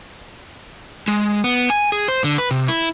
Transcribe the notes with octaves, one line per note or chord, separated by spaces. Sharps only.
G#3
B3
G#5
G#4
C5
D3
B4
C3
E4